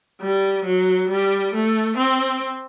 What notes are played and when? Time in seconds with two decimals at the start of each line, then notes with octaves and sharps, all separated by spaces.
0.21 G3
0.65 F#3
1.09 G3
1.53 A3
1.97 C4